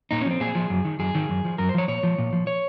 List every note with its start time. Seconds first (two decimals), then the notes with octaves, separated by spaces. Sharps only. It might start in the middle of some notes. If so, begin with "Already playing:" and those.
0.11 A#2 D#4
0.21 C#4
0.26 F3 C4
0.40 A#2 G#4
0.55 F3
0.70 F#2
0.85 D#3
0.99 F#2 G#4
1.15 D#3
1.29 F#2
1.45 F3
1.58 F#2 A#4
1.69 C5
1.74 F3 C#5
1.88 A#2 C#5
2.03 F3
2.18 A#2
2.33 F3
2.47 C#5